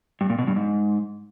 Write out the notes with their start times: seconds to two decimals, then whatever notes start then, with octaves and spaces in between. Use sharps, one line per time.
0.21 G2
0.30 A#2
0.39 B2
0.47 G2
0.56 G#2